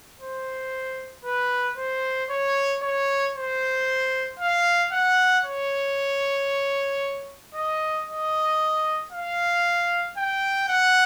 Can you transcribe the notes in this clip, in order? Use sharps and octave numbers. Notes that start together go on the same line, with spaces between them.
C5
B4
C5
C#5
C#5
C5
F5
F#5
C#5
D#5
D#5
F5
G5
F#5